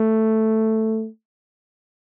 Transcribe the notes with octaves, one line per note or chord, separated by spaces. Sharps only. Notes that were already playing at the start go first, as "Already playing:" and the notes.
Already playing: A3